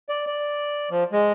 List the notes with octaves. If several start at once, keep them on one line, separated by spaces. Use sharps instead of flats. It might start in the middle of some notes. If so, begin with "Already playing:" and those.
D5
D5
F3
G#3